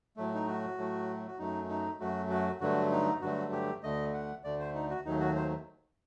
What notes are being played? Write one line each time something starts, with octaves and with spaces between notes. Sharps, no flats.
A2 F#3 A3
D#4
F#4
A2 F#3 A3
F#4
F#2 F#3 A3 D#4
D#4
F#2 F#3 A3 F#4
F#4
G2 D3 F#3 A3 F#4
D#4
G2 D3 F#3 A3 F#4
G4
D2 D3 A3 D#5
F#5
D2 D3 A3 D5
C5
D#4
F#4
D#2 D#3 F#3 A3 D#4
F#4
C5